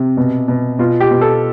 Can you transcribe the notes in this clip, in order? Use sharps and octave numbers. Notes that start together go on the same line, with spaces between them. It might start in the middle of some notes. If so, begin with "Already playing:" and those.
Already playing: C3
B2
B2
B2 F4
G4
B2
A4